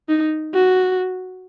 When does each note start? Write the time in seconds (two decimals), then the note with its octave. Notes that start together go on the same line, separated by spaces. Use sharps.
0.09 D#4
0.54 F#4